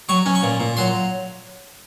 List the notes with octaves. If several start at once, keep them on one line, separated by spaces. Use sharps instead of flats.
F#3 C#6
C#4
C#6
A#2
A#2
F#3 C6